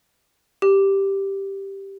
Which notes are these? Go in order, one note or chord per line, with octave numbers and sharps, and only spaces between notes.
G4